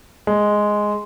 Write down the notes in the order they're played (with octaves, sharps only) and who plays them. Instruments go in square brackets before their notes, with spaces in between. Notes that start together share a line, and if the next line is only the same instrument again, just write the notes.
[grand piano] G#3